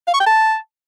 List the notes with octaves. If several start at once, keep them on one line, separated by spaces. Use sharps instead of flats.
F5
C#6
G5
A5